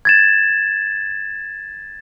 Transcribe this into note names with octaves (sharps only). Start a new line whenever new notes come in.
G#6 A6 E7